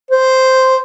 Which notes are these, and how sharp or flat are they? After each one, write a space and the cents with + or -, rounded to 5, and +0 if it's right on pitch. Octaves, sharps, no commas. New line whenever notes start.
C5 -5